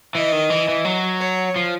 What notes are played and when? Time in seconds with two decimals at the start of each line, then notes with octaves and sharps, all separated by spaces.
0.15 E3 D#5
0.32 D#3
0.50 E3
0.68 E3
0.85 F#3
1.20 C#5
1.56 F3